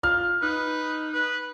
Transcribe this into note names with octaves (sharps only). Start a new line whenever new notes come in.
F4 F6
D#4 B4
B4